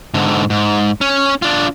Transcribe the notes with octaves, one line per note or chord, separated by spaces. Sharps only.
G#2 D3
G#2
C#4
D4 F4